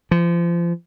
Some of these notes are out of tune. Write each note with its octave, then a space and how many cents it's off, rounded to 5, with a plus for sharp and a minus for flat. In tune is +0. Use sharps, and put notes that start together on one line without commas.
F3 -30